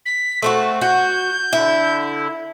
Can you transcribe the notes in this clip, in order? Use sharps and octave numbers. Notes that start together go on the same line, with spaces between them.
B6
A3 C4 F#4 A5
F#4 G6
D3 E4 E5